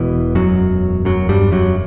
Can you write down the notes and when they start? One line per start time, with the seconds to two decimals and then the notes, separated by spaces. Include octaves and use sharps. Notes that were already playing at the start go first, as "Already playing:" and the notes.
Already playing: E1 E2 B2 E3
0.35 F#2 F#3
1.05 F#2 F#3
1.29 G2 G3
1.52 F#2 F#3